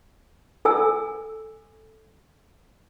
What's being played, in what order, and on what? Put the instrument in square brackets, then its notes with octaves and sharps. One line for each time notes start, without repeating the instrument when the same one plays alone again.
[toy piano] A4 G#5 E6